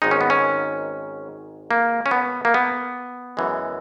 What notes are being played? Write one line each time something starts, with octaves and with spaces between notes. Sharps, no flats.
G#1 G#2 D#3 G#3 D#4
C#4
B3
C#4
A#3
C#4
B3
A#3
B3
F#2 E3 G#3